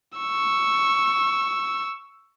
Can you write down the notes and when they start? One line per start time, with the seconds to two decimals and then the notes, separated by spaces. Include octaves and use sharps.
0.18 C#6 E6